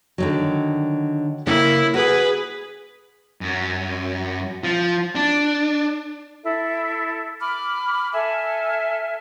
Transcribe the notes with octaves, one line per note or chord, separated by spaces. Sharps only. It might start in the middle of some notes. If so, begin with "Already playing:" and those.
D3 D#3 F#3
C#3 A#3 E4
F#4 G#4 B4
F#2
F3
D4
E4 A4 E5
B5 D6 F6
A4 E5 G#5 F6